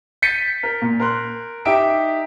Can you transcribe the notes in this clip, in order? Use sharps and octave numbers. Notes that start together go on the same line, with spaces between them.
G6 A6 B6 C#7 D#7
A#4
A#2
A#4 C6 F#6
D#4 G4 E5 D7